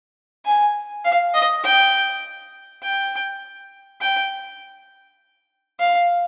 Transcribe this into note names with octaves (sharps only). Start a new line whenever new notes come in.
G#5
F5
D#5
G5
G5
G5
F5